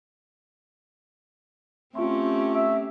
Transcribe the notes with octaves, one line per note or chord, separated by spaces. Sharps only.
A3 C4 C#4 F4 G4 C6
E5